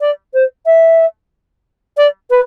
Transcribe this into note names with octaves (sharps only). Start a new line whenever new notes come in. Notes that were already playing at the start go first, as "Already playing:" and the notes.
D5
C5
E5
D5
B4